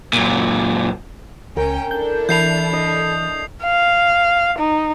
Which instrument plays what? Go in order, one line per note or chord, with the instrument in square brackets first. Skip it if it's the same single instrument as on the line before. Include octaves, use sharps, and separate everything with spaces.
[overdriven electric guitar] F#2 A#2
[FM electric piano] C#2 [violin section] C#4 G5 [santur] A#4
[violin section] D4 E4 A4 [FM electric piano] G6
[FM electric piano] E3 [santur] E5 A5 B5 [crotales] G6 C7 F7
[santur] D#5
[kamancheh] F5
D#4